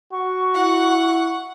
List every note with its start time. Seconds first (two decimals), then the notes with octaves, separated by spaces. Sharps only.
0.12 F#4 C#6
0.55 E4 F#5